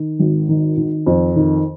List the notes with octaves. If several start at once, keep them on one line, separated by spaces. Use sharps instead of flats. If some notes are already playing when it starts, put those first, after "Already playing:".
Already playing: D#3
G#1
D#3
D#3
F2
D#3